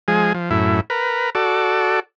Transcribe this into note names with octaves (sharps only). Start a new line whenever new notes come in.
F3 G#3 G#4
F3
F#2 A2 E4
A#4 B4
F#4 A4 D5